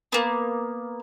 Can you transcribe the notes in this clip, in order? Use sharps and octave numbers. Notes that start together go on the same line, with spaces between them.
A#3 B3